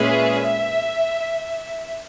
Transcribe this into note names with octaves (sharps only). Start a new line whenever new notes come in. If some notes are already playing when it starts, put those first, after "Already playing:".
Already playing: A#2 G#3 C#4 G#4 B4 E5